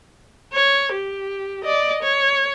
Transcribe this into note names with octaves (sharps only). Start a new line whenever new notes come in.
C#5
G4
D5 D#5
C#5